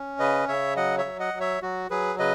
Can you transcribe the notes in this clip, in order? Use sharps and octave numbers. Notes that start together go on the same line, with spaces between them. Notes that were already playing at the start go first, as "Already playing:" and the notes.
Already playing: C#4
C#3 B4 D#5
C#3 C#5 E5
F#3 D#5 F#5
C#5 E5
F#3
D#5 F#5
F#3
C#5 E5
F#3 F#4
F#3 G#4 B4
C#3 B4 D#5